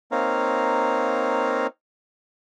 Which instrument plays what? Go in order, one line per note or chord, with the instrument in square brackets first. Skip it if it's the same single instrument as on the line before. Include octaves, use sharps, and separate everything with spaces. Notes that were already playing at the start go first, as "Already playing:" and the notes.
[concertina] A#3 C4 D#4 C#5 F5 A#5